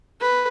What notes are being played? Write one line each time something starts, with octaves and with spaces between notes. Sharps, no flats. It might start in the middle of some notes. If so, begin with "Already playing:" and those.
B4